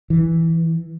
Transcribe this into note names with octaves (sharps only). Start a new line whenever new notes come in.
E3